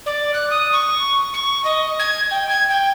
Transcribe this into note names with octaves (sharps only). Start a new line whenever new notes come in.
D5
F#6
D#6
C#6
C#6
D#5
G#6
G5
G#6
G5